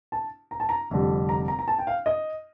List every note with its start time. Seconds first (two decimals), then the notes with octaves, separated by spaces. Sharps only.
0.12 A5
0.51 A#5
0.60 A5
0.69 A#5
0.90 F1 F2 D3 G3
1.29 A#5
1.48 A#5
1.59 A#5
1.68 A5
1.79 G5
1.87 F5
2.06 D#5